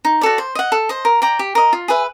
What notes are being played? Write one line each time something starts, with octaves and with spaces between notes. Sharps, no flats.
D#4
F#4 A4 D5
C5
D#5 F#5
A4
C5 D#5
A#4
D5 G5 A#5
G4
A#4 D#5
F4
G#4 B4 E5